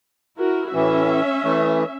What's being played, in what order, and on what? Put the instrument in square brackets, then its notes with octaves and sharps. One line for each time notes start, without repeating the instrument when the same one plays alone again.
[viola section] E4 F#4 A#4
[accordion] A2 E3 [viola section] C#4 E5
[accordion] E3 A3